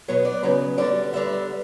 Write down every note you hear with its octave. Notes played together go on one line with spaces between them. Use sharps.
B2 F#3 B3 C#5
D5
C#3 F#3 B3
D3 G3 B3 D5
D3 G3 B3 E5